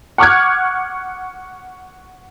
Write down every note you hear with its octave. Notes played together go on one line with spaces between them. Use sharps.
F#5 C#6 D6 F6 F#6 G#6